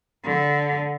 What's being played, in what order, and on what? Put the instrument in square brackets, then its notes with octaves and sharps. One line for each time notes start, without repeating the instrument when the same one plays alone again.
[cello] D3